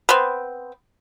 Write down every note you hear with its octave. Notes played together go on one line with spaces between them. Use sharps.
B3 C4